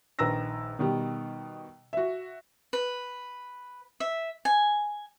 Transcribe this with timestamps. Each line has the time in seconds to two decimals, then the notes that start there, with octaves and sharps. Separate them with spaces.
0.19 A#1 D#3 B4 A#5 E6 A#6
0.79 B2 D#3 G3
1.93 F#4 E5
2.73 B4
4.00 E5
4.45 G#5